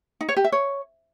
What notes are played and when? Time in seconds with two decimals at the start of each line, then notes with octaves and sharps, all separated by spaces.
0.21 D#4
0.29 C#5
0.37 G4
0.44 E5
0.52 C#5